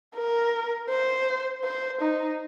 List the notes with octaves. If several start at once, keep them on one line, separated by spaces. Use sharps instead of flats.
A#4
C5
C5
D#4